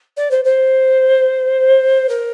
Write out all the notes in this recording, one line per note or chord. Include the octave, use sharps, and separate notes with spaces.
D5
C5
C5
A#4